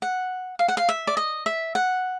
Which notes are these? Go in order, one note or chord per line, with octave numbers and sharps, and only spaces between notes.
F#5
F5
F#5
F5
E5
D5
D#5
E5
F#5